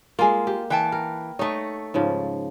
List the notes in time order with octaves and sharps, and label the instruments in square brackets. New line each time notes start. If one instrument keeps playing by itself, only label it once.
[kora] G#3 A#3 [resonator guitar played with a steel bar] F4 G#5
[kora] G4
[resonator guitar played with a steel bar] E3 G5 A5
[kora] A#4
[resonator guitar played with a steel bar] A3 C#5 [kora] D#4 D#5
[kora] G#2 C#3 F3